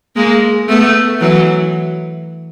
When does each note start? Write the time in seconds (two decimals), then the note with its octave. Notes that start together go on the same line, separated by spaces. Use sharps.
0.16 G#3 A#3
0.69 A3 B3
1.20 E3 F#3